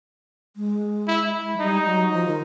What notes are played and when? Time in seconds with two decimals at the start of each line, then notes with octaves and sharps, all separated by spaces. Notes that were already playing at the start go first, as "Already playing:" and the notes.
0.56 G#3
1.08 E4
1.54 F#3
1.60 G3 D#4
1.85 F#3
2.12 F3
2.27 D#3